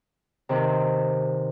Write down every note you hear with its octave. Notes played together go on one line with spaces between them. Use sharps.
C3 D#3